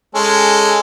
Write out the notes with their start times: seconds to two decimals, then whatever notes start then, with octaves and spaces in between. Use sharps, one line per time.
0.15 G#3 C#4 A4